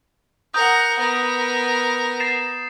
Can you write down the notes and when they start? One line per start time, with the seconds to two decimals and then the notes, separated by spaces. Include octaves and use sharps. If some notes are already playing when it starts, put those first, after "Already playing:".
0.54 A#4 F#5 D#6 G6
0.99 B3 A#4
2.20 A6 C7 E7